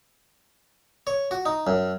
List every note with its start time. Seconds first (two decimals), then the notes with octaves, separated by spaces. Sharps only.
1.07 C#5
1.31 F#4
1.46 D#4
1.67 F#2